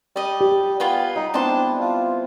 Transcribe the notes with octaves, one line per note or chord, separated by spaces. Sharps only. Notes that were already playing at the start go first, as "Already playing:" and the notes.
G3 D5 D#5
G4
B3 F4 B4 G5 G#5
G3 D#4
B3 C4 D4 E4 A5 C6
F4